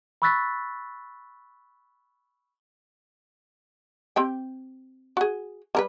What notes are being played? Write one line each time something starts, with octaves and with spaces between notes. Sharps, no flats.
B5 C#6 E6 F#6 A6 B6
C4 G4 G5
F#4 G#4
G3 A#4 B4